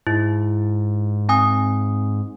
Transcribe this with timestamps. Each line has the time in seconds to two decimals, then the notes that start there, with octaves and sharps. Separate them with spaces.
0.07 G#2 E4
1.29 C4 G#5 D#6